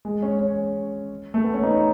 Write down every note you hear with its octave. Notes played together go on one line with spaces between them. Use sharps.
G#3
C#4
C#4
A3
B3
C#4
D#4